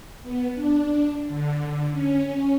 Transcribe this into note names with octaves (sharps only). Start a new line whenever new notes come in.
B3
D4
D3
C#4